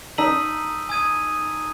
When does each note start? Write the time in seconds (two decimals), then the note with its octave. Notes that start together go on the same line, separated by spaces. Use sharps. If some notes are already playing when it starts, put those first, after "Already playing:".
0.18 D#4 A5 E6 B6 D#7 F#7
0.89 G#5 D#6 G#6 D#7